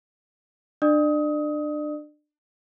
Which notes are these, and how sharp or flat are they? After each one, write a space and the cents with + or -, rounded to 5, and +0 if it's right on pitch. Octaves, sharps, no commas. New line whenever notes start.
D4 +25 D5 +35 D#6 +25